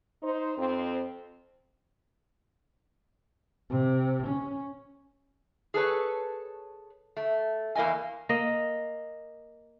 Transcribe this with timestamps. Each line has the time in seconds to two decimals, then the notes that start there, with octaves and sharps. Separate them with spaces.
0.22 D#4 C5
0.57 F2 C4
3.70 C3
4.28 C#4
5.74 G#4 A4 B4 C#5
7.17 A3
7.75 E2 A#3 E4 D#5 G#5
8.29 A#3 D#5